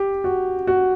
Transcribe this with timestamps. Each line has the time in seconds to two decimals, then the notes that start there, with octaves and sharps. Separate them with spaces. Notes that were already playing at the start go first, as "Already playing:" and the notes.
Already playing: G4
0.24 F#4
0.67 F#4